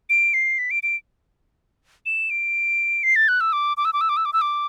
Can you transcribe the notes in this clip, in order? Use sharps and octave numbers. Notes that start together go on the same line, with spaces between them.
D7
C7
B6
D7
D7
E7
D7
C7
A6
F#6
E6
D6
D6
E6
D6
E6
D6
E6
D6
E6
D6